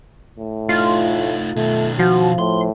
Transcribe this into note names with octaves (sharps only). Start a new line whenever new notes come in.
A2
A3 D#4 F4
B2 D#3 A3
F3 F#4
A2 C6